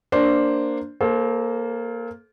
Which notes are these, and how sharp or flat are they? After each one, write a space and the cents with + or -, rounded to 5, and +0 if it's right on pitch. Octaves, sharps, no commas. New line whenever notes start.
A#3 -5 D4 +0 C5 +0
A#3 +0 A4 -35 C5 +15